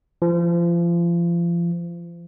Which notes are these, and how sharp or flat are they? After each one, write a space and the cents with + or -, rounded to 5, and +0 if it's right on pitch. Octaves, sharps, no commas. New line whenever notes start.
F3 -30